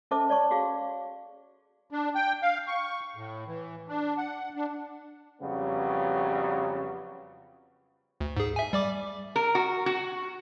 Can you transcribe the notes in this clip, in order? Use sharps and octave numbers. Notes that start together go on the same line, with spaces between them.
C#4 A4 C5 E5 A5 D6
C#5 D5 A5 C#6
F#4 G#4 F5
D4
G5
F5
C#6
A2
E3
D4
F#5
D4
F2 C#3 F#3 G3 B3
D2
G#2 G#4
E5 G#5
G3 D5 D6
A#4
F#4
F#4